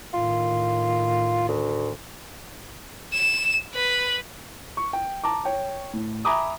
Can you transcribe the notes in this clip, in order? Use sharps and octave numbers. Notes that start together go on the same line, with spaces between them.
A2 D#3 F4
D2
E7
B4
C#6
G5
A5 A#5 D6
C#5 G5
A2
E5 G#5 A#5 B5 D6 D#6